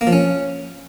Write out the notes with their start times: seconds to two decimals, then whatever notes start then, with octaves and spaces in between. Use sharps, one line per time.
0.01 A#3
0.07 F3
0.13 C#4